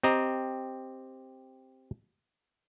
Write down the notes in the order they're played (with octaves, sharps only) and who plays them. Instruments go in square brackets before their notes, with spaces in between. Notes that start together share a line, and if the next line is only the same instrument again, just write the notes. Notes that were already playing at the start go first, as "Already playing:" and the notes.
[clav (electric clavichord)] C4 G4 D#5 A#5